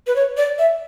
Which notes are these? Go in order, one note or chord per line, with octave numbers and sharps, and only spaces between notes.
B4
C#5
D5
E5